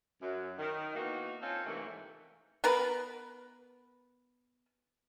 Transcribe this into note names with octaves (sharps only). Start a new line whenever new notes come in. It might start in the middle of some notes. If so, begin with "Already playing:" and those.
F#2
D#3
E3 A#3 B3 D#4 F#4
C4 C#4 F4 A4
G#2 C3 E3 A3 A#3
B3 A#4 B4